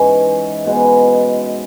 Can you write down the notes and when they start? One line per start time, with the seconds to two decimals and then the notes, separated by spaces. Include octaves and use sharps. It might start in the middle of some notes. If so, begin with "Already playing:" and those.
Already playing: G#2 E3 G#3 C#4
0.66 B2 G#3 B3